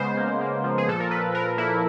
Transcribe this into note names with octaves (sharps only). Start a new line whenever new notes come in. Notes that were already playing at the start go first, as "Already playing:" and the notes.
Already playing: C#3 G#3 B3 C5
A#3
A#3
F3
G#4
A#2 A4
A#4
A#2 B4
A#2 A#4
A#3 E4